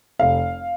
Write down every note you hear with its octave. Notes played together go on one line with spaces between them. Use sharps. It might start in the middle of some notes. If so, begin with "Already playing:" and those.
F1 F5